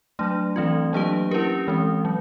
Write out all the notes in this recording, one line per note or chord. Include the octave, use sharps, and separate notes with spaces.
F#3 A3 D4
E3 A3 C4 F4
F#3 A#3 D4 G4 B4
C#4 E4 G4 A#4
E3 G#3 C4
F#3